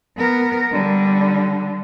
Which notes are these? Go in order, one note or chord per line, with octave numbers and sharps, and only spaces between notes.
B3 A#4
D3 G3